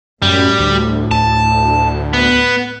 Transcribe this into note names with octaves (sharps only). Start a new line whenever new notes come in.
F#2 A2 G3
D2
D2 A5
B3